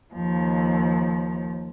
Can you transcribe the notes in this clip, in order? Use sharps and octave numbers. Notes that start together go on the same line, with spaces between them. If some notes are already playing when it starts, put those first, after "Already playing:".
D#2 F3